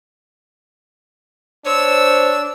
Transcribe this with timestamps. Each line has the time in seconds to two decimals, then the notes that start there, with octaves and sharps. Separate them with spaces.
1.66 D4 C5 C#5 E6